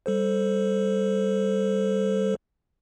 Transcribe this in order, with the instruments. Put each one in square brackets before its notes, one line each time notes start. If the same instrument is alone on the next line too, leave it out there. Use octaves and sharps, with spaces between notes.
[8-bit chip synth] G3 A4 C5